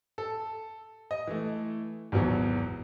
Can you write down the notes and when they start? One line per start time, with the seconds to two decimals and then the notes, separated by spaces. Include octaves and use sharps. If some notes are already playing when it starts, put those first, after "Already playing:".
0.18 A4
1.11 D#5
1.27 E3 A3
2.12 G#1 E2 B2 F#3